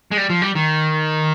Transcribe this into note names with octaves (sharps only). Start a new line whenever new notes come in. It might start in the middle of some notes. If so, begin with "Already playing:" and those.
G#3
G3
F3
G3
D#3